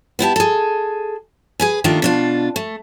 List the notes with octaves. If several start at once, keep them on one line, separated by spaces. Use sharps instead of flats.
B3 E4 G4 A5
G#4 A4
G#4 B4 G#5
D#2 D#3 A3 D4 F4
B2 D4 F4
A3